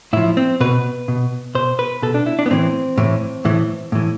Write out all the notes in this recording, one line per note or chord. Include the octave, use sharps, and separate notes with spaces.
A2 F3 E4
C4
B2 B4
B2
B2 C5
B4
B2 A4
D4
E4
D4
B3
A2 E3 C4
A2 E3
A2 E3
A2 E3